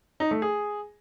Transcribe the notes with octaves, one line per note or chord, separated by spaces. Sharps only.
D#4
A3
G#4